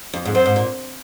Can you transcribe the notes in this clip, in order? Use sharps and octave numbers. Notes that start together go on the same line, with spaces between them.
F2
G#2
F#2 C5
G#2
A#2